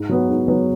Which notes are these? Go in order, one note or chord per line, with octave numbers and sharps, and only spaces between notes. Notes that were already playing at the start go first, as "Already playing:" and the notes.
Already playing: G#2
F#3 B3 F#4 B4
G#2
F#3 B3 F#4 B4